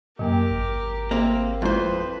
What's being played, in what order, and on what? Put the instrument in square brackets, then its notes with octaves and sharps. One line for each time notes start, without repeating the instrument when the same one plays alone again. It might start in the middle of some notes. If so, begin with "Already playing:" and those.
[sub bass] F#2 [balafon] F#3 A#3 G5 [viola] G4 A#4
[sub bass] G#1
[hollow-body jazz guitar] A#3 C4 [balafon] G#4 E5
[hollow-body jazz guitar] F2 C5 [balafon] G#3 E4 [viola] B4